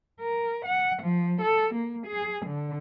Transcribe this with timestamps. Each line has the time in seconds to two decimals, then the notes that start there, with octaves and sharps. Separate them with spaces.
0.20 A#4
0.65 F#5
1.03 F3
1.41 A4
1.74 A#3
2.07 G#4
2.46 D3